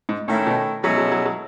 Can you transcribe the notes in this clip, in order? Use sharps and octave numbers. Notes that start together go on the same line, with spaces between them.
G#2
A2 D#3 A3 C#4 E4
B2
B2 F#3 G#3 C#4 E4 A4
F#3
F#3
F#3